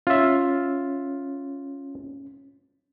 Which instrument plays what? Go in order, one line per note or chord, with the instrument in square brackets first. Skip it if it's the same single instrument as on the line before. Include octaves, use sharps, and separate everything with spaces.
[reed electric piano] C#4 [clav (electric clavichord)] F4 E5